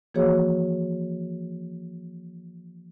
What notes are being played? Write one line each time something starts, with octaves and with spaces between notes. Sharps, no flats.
E3 F3 A#3 F#4 G#4 C#5